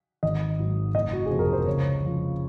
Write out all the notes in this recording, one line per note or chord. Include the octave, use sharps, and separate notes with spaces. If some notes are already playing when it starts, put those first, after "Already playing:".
G#1 D#5
G#2 F#3
F#1 D#5
F#4
F2 C3 F3 G#4
A#4
C5
C#2 C#5
C#3 F3